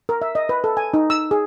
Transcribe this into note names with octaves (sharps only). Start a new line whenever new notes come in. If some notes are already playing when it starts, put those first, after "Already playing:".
A#4
E5
D#5
B4
A4
G#5
D#4
E6
G#4